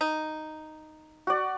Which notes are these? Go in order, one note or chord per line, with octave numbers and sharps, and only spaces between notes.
D#4
F#4 D5